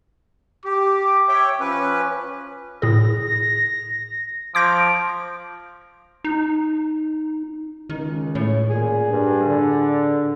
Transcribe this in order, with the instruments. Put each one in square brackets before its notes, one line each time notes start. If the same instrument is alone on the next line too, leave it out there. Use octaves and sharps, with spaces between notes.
[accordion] G4 [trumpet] D6
[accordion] C#5 E5 G5
F3 C#4 B4
[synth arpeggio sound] A2 G#4 [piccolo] A#6
[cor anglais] F3 [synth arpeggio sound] D6 G6 A#6 [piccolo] D7
[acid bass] D#4
[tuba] C#2 [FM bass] D#3
[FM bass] A2 [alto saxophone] C#5
[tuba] A#2 [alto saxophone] G#4
[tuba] G2
D3